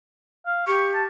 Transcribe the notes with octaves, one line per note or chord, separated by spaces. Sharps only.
F5
G4 C#6
A5